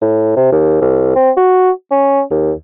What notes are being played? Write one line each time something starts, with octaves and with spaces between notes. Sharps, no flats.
A2
C3
D#2
C2
C4
F#4
C#4
D#2